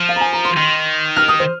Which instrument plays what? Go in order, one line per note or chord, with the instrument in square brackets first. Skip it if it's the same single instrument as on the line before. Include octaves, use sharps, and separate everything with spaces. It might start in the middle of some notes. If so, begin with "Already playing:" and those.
Already playing: [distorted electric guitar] F3
[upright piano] F5
A#5
G#5
A#5
C6
[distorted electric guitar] D#3 [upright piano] C6
[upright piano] F6
D#6
C5